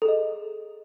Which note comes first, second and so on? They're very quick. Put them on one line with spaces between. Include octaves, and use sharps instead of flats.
A4 G#4 D#5